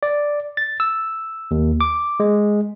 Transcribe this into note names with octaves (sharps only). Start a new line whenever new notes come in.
D5
A6
E6
D#2
D6
G#3